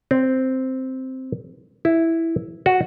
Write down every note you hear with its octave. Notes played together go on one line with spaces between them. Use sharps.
C4
E4
F#4